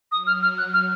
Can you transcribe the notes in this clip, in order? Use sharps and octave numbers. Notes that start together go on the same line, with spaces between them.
F#3 D#6
F6
F6
F#3 F#6
F6